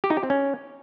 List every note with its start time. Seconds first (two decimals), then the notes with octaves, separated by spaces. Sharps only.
0.04 G4
0.10 D#4
0.17 G4
0.23 C4
0.30 C#4